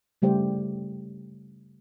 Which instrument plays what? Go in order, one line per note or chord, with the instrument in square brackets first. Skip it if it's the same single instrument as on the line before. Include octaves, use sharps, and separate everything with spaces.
[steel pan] C#3 G3 A3 G4 C5